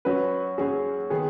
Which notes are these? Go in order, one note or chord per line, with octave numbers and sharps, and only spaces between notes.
F#2 F#3 C#4 F#4 B4
F#2 F#3 C#4 F#4 G#4
D#3 B3 G#4